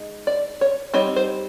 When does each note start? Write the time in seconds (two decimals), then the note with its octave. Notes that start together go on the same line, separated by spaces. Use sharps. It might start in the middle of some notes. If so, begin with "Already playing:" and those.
Already playing: G#3 D#4
0.27 D5
0.61 C#5
0.94 G3 C4 D#4 C#5
1.16 C5